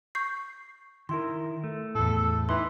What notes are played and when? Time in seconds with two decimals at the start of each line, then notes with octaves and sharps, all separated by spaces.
0.15 C#6 G6 C7
1.09 D#3 E4 A#4 C6
1.64 A3
1.95 E2 A2 A4
2.49 E3 D#4 B4 C6